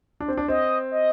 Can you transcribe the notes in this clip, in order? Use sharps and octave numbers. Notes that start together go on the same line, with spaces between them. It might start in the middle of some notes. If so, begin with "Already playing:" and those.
D4
C4
D4
C4 D#5
D#5